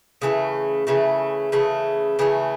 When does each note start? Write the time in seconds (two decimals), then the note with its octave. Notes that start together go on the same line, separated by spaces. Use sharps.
0.22 C#3 E3 A3
0.87 C#3 E3 A3
1.52 C#3 E3 A3
2.19 C#3 E3 A3